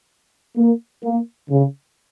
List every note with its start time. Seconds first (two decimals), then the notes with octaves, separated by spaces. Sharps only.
0.57 A#3
1.03 A#3
1.49 C#3